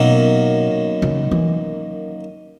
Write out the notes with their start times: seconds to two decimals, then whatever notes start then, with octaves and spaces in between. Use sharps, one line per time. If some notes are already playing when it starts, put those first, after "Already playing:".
Already playing: F#2 B2 D#3 F#3 A#3
1.02 C#3
1.31 E3